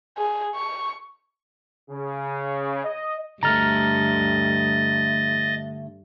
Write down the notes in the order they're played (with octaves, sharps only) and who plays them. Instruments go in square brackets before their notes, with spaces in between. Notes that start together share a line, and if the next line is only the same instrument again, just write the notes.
[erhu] G#4
C#6
[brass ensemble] C#3
D#5
[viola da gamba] G2 [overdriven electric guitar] D3 A3 [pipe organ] D#5 A6 [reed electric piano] A#5 F6